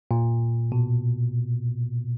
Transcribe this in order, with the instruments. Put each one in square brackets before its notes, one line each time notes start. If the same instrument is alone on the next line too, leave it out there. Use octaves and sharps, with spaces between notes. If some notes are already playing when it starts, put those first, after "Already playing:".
[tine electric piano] A#2
B2